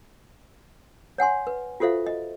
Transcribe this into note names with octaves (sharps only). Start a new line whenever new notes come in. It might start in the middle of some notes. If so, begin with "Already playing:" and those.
C#5 F#5 G#5 C6
B4
F4 F#4 A4 C5 E5 F5
D#5